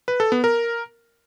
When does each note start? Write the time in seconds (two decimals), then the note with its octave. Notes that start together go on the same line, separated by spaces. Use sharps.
0.08 B4
0.20 A4
0.32 B3
0.44 A#4